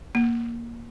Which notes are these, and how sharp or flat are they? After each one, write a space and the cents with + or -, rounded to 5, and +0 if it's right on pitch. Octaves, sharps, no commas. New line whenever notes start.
A#3 +5